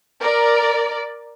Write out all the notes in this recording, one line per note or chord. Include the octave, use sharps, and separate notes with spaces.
A#4 D5